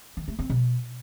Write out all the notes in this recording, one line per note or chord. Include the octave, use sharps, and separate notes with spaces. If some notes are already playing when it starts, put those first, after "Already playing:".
D#3
A3
C4
B2